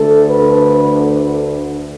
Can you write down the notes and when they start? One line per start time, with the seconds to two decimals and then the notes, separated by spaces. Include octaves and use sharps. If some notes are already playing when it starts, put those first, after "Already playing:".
Already playing: D2 D3 A3 A4
0.27 B4